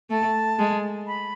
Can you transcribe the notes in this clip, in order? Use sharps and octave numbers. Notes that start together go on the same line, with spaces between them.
A3 A5
G#3
B5